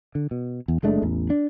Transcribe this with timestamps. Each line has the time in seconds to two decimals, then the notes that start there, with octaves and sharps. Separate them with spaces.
0.15 D3
0.31 B2
0.68 E2
0.83 F#1 G#3 A3 D4
1.02 A1 E2
1.30 D4